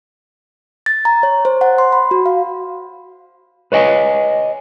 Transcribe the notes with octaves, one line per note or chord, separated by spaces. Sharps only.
A6
A#5
C#5
C5
F#5
C6
B5
F#4
F5
B4 C#5 D#5 G#5